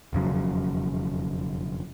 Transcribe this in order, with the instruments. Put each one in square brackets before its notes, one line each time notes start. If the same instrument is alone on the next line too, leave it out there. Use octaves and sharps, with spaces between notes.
[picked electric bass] E1 F2 C#3 F#3